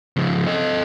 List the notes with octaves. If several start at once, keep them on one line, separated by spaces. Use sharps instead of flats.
C#3 F3
A4 D#5